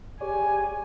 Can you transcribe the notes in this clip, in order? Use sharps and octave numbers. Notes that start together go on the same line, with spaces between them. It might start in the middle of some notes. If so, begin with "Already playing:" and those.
G4 G#4 C#5 D5 G#5